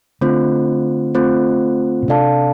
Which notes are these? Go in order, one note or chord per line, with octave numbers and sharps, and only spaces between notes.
D3 A3 C4 F4 C5
A3 C4 F4 C5
A#2
C3 D4 A4 D5 F5 A5